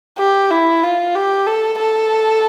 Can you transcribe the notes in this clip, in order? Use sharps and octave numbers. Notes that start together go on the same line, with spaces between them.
G4
E4
F4
G4
A4
A4